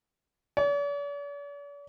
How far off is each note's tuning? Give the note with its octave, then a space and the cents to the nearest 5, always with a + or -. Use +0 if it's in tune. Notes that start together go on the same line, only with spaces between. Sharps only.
D5 -45